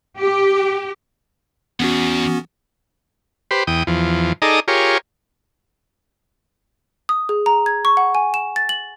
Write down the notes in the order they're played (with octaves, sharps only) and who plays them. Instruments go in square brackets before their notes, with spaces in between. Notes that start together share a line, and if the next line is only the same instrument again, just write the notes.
[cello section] G4
[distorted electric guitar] E2 [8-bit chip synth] B3 C#4 F#4
[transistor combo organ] G4 B4 C5
E2 G5 D#6
E2 F3
D#4 G#4 A4 D5 D#5 A#5
F4 G4 G#4 A#4 C#5
[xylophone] D#6
G#4
A#5
G#6
C#6
F#5
G#5
E7
A6
F#7